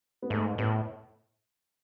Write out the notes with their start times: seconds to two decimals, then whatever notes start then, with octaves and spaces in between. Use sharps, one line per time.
0.22 B3
0.30 G#2 A3
0.58 A2 B3